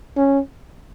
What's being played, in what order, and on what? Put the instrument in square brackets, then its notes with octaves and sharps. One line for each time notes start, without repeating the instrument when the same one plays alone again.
[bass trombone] C#4